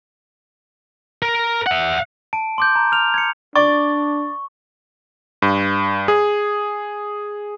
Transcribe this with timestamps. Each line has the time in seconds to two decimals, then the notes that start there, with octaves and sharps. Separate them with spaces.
1.22 A#4
1.67 E5 F#5
2.33 A5 D7
2.58 C6 D6 G6
2.75 A#5
2.92 F6 F7
3.14 G#6 C#7
3.56 D4 D5 C#6
5.42 G2
6.08 G#4